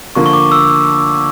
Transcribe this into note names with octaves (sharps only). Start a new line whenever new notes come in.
D3 F3 A#3 C#6
C#6
D6
E6